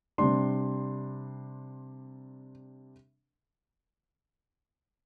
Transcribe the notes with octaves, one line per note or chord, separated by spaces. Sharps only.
C3 G3 D4 C6